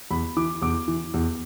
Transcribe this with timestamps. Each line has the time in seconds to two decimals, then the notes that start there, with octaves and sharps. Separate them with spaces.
0.11 E2 B5
0.37 E3 D6
0.62 E2 D6
0.88 E3
1.14 E2